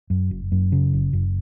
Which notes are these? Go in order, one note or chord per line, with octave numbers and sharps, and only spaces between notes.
F#2
F#1
F#2
C#3
F#1
F#1